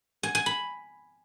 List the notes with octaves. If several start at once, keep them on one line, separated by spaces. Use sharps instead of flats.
G#5
G#5
B5